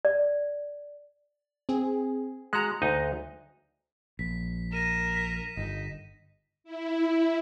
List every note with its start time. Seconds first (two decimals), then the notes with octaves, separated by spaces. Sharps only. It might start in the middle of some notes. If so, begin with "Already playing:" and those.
0.05 D5
1.69 C4 G#4
2.53 G#3 F#4 A#5 F#6
2.82 D2 D#4 D#5
4.19 A#1 B6
4.72 A#4 A#6 D#7 E7
5.15 B6
5.57 G1 D#4
6.64 E4